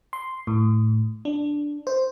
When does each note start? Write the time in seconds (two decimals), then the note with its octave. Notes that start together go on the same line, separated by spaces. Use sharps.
0.13 C6
0.47 A2
1.25 D4
1.87 C5